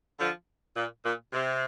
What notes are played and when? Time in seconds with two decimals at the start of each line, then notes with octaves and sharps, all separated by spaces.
0.19 D3 F3
0.76 A#2
1.04 A#2
1.33 C3